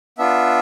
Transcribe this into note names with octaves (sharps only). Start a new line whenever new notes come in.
B3 D4 F4 E5